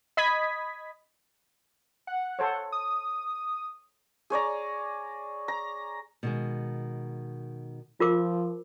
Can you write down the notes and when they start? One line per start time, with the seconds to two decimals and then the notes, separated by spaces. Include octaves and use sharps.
0.17 D#5 B5 D#6 G#6 B6
2.07 F#5
2.39 A4 C5 C#5
2.72 D#6
4.30 G#4 C#5 D5 A#5
5.48 A#5
6.23 B2 D#3 G#3
8.00 F3 F4 A#4 D6